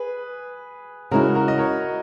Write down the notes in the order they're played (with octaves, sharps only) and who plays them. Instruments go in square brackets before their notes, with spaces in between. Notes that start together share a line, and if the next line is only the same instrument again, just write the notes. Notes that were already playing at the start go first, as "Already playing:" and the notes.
Already playing: [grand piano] G#4 B4
[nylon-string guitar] C#3 G#3 C#4 E4 [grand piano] F#4 A#4
[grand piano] F#4 A#4
D#5
A#4 C#5